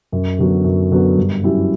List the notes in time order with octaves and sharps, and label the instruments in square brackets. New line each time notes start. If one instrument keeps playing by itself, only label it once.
[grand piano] F#2
D3 F#3 B3
F#2
D3 F#3 B3
G2
F#3 C#4 E4 G4